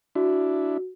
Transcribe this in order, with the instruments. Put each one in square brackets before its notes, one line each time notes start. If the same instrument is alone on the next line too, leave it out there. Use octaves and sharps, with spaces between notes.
[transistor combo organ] D4 E4 [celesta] F#4